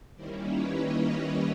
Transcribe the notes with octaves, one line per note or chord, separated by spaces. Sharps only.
D#3 G3 A#3 C#4 E4 C5 D5
B4 C#5
C#5 D#5